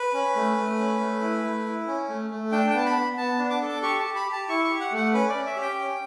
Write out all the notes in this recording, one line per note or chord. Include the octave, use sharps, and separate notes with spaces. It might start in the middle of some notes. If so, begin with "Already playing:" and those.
Already playing: B4
C#4
A3
A3
C#4
A3
E4
A3
E4
C#4
A3
A3
D4 G5
G5
B3 A5
B5
B3
B3 A5
D4
D6
A4
D6
G4 C#6
A5
G4
B5
G4
A5
E4 C#6
C#6
G4
F#5
A3 F#5
C#4 B4
D5
C#4
E5
G4
G5
C#4